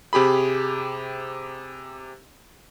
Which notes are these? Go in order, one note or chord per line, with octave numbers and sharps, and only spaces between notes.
C3 G4 G#4 B5